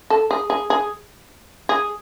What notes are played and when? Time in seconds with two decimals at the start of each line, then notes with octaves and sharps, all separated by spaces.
0.10 A4
0.31 G#4
0.50 G#4
0.70 G#4
1.69 G#4